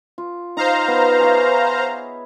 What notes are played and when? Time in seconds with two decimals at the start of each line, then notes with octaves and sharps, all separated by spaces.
0.18 F4
0.57 D#4 C5 F5 A#5
0.88 B3
1.20 G#4 C#5 E5